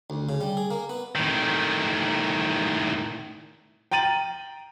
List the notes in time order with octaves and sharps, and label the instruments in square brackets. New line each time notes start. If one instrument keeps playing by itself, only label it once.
[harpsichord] D2
C#3
G3
G#4
A#3
B3
[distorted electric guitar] A2 D#3
[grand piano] G5 A#5 A6 D#7 F#7